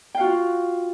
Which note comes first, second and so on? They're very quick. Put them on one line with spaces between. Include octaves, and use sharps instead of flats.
G5 F5 F#4 F4